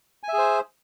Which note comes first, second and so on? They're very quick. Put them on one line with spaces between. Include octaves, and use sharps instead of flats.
G#5 E5 G#4 C5